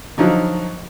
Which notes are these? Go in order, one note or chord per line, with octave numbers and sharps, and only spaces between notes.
D3 F3 F#3 D#4